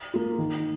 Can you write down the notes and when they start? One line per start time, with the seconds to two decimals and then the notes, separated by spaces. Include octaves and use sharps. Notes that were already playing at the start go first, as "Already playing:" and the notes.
0.14 A#3 F4
0.38 D#3